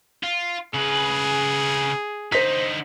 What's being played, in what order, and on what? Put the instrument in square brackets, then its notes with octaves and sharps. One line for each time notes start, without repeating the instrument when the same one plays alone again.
[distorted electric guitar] F4
[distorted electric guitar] C#3 B4 [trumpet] G#4
[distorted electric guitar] D3 D#4 [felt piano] C5 B6